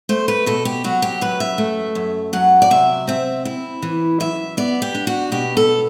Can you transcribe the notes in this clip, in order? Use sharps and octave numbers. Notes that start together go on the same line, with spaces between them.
A3 C5
B4
B2 A4
G4
F#3 F#4
G4
F#2 B4
E5
A3
F#2
F#3 F#5
D5
C3 E5
C4 E5
E4
E3
F#2 E5
B3 D5
G4
D4
F#4
B2 G4
A4